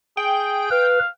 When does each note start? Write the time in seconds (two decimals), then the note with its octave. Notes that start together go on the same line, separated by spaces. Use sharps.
0.17 G#4 G5
0.71 B4 F5